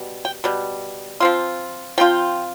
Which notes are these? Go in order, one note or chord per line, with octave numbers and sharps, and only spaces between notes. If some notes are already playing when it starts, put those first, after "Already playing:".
Already playing: B2 G3
G5
B2 G3
F3 C4 F4
F3 C4 F4 G5